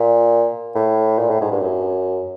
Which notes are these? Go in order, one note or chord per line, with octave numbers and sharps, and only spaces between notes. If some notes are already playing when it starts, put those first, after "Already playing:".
Already playing: A#2
A2
A#2
A2
G#2
G2
F#2